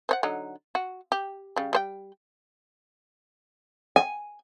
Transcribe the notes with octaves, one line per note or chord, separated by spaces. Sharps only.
C5 C#5 F#5
D3 F#3 D#4
F#4
G4
C#3 G3
G3 C5 G5
G#5